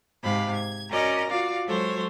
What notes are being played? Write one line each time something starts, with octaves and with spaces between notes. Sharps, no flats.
G#2 C3 F5 B5
G#6
C#4 F#4 A#4 D5 D#5 A#5
F4 F#4 D5 F5
F#3 G#3 A4 C5 C#5